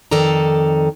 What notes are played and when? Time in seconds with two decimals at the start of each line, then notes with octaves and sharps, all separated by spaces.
0.11 F2 D#3 A4 D5 A#5